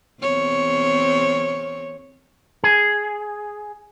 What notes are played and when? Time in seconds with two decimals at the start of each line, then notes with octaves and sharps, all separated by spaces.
0.22 E2 C4 C#5
2.64 G#4